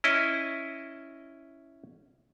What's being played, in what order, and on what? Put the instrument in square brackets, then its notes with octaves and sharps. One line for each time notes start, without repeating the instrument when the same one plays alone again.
[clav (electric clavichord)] C#4 E4 D#5